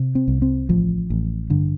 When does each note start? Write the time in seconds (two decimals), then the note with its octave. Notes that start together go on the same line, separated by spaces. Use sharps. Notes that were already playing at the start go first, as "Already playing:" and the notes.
Already playing: C3
0.15 C4
0.28 C2
0.42 C4
0.69 A1 F3
1.10 A1
1.50 G2 D3